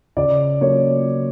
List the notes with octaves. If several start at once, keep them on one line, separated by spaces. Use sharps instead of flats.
C#3 D5
F#3 A#3 C#4 C#5